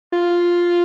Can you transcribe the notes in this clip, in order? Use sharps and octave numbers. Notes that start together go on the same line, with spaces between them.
F4